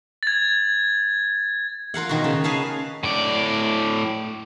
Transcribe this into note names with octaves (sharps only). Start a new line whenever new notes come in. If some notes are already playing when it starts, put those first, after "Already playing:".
G#6 A6
F4 A#4 F5 F#5
B2 D#3 F#4
C#3
G#4 B4 C#5 F5 A5
A2 D5